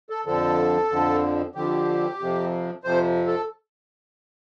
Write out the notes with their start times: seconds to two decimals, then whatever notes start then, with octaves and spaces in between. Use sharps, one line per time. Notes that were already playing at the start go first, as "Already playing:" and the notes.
0.10 A4
0.26 F2 D3 F3 A4
0.90 F2 D3 F3
1.55 F2 D3 F3 G4
2.19 F2 C3 F3
2.84 F2 C3 F3 C5
3.27 A4